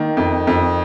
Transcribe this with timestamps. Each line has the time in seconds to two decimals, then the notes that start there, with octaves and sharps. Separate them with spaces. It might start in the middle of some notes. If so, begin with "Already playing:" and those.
Already playing: D#3 A#3
0.17 F2
0.47 F2